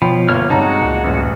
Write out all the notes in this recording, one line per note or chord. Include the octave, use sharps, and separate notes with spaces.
B2 F3 C#5 G5 B5
G1 A#3 C#5 F6
G2 C3 G#3 D#4 F#4 A5 A#5
C#2 A#2
A1 F#2